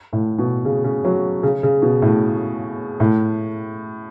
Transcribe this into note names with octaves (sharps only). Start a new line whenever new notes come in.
A2
B2
C#3
C#3
F#3
C#3
C#3
B2
A2
A2